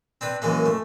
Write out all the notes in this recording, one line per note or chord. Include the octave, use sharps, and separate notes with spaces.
C4 D4 B4
F#2 E3 G#3 A#3
A3